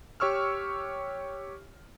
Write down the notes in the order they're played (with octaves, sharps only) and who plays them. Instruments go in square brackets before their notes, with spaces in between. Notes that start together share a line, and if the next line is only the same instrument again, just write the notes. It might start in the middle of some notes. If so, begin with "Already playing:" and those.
[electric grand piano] G4 C#5 C#6 E6 F6